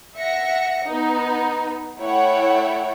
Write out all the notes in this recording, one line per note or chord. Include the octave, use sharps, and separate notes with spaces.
E5 F#5 A#6 C#7
B3 D#4
A3 E4 C#5 F#5 G5